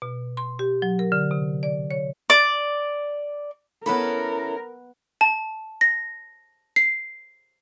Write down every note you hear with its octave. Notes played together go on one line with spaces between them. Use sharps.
B2
C6
G4
F#3
A#4
D3
C3
D5
C#5
D5
B3 C#4 E4 A4 A#4 B5
A5
A#6
C7